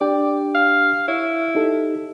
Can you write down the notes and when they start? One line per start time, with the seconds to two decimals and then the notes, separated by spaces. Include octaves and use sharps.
0.01 D4 G4 D5 G5
0.55 F5
1.08 E4 C#5
1.55 D#4 G4 A4